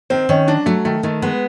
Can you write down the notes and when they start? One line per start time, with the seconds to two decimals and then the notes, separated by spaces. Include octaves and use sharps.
0.10 D#3 C4
0.29 D#3 C#4
0.48 F#3 D4
0.66 F#3 A3
0.85 D#3 A3
1.03 D#3 A3
1.22 G#3 B3